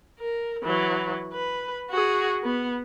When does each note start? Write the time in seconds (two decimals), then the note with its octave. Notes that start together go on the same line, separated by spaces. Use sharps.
0.19 A#4
0.63 E3 F#3
1.33 B4
1.90 F#4 G#4
2.43 B3